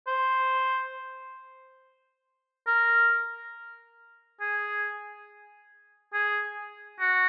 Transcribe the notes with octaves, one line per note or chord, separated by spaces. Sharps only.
C5
A#4
G#4
G#4
F#4